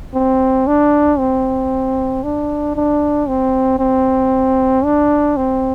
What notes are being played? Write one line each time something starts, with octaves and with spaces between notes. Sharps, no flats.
C4
D4
C4
D4
D4
C4
C4
D4
C4